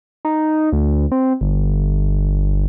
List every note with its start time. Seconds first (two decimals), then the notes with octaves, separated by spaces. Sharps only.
0.25 D#4
0.72 D2
1.12 C4
1.41 G1